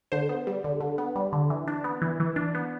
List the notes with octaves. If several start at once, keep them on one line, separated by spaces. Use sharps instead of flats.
D3 C5
B3
G3
D3
D3
B3
G3
D3
E3
D4
B3
E3
E3
D4
B3